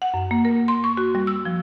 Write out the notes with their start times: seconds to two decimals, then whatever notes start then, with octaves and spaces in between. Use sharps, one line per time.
0.02 F#5
0.14 F#2
0.31 A#3
0.45 A#4
0.68 C6
0.84 C#6
0.97 F#4
1.15 G3
1.27 E6
1.45 F3